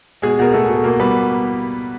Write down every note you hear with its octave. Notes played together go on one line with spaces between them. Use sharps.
B2 G#3 G#4
B2 A#4
B2 A3 A4
B2
B2 A#3 A#4
G3 B3 B4